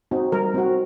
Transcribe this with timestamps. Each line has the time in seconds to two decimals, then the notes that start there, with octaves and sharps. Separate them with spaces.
0.11 C4 D#4 F#4
0.32 G3 A#4
0.54 C4 D#4 F#4